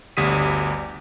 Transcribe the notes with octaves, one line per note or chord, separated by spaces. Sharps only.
G1 D2 G3 D#6 B6 D#7